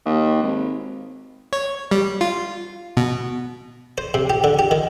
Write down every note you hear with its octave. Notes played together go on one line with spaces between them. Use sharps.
D#2
G#1
C#5
G3
F4
B2
C5
C3
G4
D3
G4
D#3